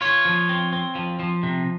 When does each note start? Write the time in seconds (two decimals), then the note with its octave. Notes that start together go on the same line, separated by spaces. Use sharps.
0.01 F4 C#5
0.25 F3
0.49 C4
0.73 C4
0.95 F3
1.20 F3
1.43 C3